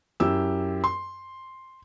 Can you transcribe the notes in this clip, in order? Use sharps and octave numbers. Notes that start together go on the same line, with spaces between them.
F#2 E4 G4 E6
C6